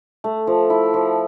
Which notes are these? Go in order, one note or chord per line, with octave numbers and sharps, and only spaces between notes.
A3
F3
E4
F3